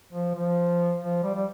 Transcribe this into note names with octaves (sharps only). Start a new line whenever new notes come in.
F3
F3
F3
G3
G3